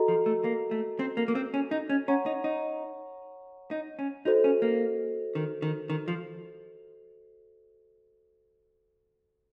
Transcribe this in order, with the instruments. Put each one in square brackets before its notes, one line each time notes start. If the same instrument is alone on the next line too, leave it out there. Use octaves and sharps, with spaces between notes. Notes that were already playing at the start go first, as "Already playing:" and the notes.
Already playing: [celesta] F#4 A4 D#5 A#5
[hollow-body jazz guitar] F3
A3
A#3
A3
C4
A#3
A#3
C4
C#4
D#4
C#4
[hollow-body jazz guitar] C#4 [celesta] C#5 F#5 A#5 C#6
[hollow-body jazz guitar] D#4
D#4
D#4
C#4
[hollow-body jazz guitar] D#4 [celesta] F#4 A4 C5 D#5
[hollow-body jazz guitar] C#4
A#3
D#3
D#3
D#3
F3